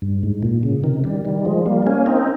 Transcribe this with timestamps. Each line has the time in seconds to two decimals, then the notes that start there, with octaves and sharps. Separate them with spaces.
0.02 G2
0.23 G#2
0.43 A#2
0.63 C#3
0.84 C3 D#3
1.04 D#3 G3
1.25 D#3 G3
1.45 F3 G#3
1.66 G3 A#3
1.87 A#3 C#4
2.06 C4 D#4